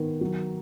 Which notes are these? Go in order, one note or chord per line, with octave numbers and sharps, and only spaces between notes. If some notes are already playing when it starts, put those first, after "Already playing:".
Already playing: D#3 B3
F#3